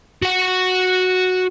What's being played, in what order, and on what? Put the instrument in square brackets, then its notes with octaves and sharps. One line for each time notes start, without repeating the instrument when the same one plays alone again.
[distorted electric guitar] F#4 F#5